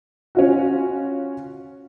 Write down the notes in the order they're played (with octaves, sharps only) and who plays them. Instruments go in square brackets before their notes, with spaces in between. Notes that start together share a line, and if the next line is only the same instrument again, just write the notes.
[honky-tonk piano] C#4 F4 F#4